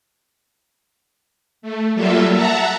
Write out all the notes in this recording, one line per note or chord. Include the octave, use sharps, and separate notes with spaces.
A3
F#3 G3 A#3 F4 A4 E5
E5 F#5 A5 A#5